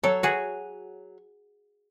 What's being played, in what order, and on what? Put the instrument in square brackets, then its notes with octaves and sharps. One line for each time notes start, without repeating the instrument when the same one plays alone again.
[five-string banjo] F#3 C#5 [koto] A4
[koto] F#4 G#4